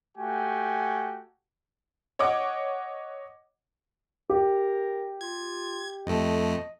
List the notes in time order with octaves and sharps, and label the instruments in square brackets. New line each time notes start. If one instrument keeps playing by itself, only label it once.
[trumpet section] A3 F#4 G4 G#5
[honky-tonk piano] C#5 D#5 F#5 D6
[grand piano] G4 [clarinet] A#4
[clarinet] F4 [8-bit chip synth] G#6
[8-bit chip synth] F2 A3 [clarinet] D#5